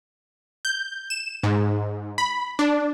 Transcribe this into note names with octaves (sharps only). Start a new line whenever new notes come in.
G6
E7
G#2
B5
D4